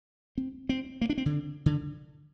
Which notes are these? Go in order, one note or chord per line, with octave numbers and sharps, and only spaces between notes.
C4
C4
A#3
D4
C4
D3
D3